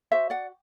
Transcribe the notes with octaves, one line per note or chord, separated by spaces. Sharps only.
F#4 C5 E5
D5 F#5